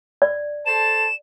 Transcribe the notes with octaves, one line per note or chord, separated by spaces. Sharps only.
D5
A4 C5 A5 E7